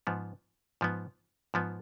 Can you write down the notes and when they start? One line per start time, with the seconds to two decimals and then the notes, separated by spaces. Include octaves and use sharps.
0.07 G#2 F3 B3
0.81 G#2 F3 B3
1.54 G#2 F3 B3